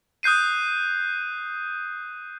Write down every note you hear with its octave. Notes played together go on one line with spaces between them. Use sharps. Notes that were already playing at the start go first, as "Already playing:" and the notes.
D#6 F#6 G6 C7 D#7